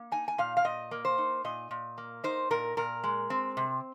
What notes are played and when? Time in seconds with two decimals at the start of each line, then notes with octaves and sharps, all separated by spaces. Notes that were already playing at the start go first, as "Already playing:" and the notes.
Already playing: A#3
0.12 D#4 G#5
0.28 G#5
0.38 A#2 F5
0.57 F5
0.65 A#2 D#5
0.91 A#3
1.05 C5
1.18 D#4
1.45 A#2 D#5
1.71 A#2
1.98 A#3
2.24 D#4 C5
2.51 A#2 A#4
2.77 A#2 A#4
3.04 G#3
3.30 C4
3.57 C3